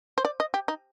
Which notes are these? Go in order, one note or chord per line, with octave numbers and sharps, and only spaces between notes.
C5
D5
D#5
G4
D#4